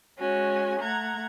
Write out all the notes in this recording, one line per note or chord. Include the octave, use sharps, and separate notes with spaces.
G#3 C#4 F#4 G#5
A3 F#5 A#5 G#6